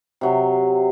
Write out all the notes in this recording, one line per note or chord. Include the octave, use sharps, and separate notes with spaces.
C3 F#3